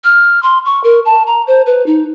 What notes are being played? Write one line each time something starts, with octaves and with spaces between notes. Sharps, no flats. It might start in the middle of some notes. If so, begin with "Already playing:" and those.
F6
C6
C#6
A#4
A5
A#5
C5
B4
D#4